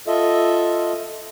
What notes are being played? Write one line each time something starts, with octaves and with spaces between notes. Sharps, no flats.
F4 A4 D#5 E5